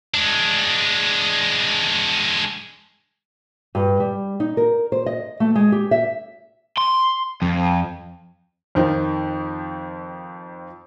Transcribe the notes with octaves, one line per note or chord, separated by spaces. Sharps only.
G#3 D4
G2
G3
D#4
A#4
C5
D#5
A3
G#3
G4
E5
C6
F2
F2 D#3 F3